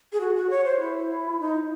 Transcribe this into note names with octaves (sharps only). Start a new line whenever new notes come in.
G#4
F#4
F#4
C#5
C5
E4
D#4